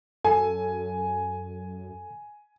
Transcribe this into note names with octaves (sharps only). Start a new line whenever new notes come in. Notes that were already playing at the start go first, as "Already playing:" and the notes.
F#2 A4 G#5